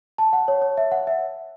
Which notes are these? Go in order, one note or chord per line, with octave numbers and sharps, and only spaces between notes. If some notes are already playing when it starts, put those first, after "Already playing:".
A5
F#5
C#5
C#5
E5
F#5
E5